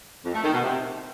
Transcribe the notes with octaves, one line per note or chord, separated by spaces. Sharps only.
F2
A3
D#3
B2
C3